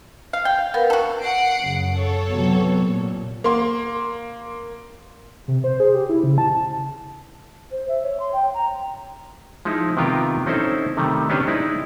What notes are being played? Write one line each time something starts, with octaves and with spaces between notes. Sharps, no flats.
F5
G5
F5
B3 A#4 B4 F5
F#4 A4
F#5 C7 D7
F#2 C#3
A4 C#5
C3 F#3 B3
A#2
A#3 C6
C3
C5
G#4
G4
E4
C#3
A5
C5
E5
C#5
C6
G5
A#5
F3 G#3 D#4 E4
C3 D#3 B3 F4 G4 A#4
C4 C#4 D#4 E4 A4 C5
C3 D#3 G3 A3
B3 C#4 D4 G4 B4 C5
G#3 D#4 E4 D5